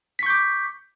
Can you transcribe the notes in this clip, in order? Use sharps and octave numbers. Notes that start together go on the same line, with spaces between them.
C#6 D6 G6 B6